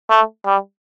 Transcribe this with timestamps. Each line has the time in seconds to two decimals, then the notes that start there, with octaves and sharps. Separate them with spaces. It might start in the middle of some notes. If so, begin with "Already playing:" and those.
0.10 A3
0.46 G3